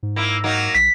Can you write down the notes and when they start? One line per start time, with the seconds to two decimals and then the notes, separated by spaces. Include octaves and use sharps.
0.03 G#2
0.16 A#3 E4
0.44 F#3 A#3 D#4
0.75 B1 B6